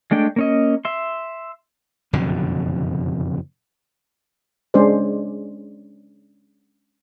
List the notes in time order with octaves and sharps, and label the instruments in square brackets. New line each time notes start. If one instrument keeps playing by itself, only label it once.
[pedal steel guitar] G#3 A3 D4 G5
A#3 C#4 D#5
E5 C6
[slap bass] F#1 F2 B2 D3
[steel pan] G#3 C#4 D4 G#4 C5 D5